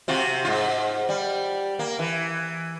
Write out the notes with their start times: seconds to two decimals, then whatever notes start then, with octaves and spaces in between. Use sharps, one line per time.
0.08 C3 F4 F#4
0.45 G#2 F4
1.09 G3
1.79 A#3
1.99 E3